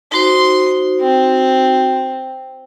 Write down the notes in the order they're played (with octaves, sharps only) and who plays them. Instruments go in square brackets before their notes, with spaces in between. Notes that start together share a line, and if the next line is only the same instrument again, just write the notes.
[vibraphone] D#4 F#4 C5 [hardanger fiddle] C6
[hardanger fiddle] C4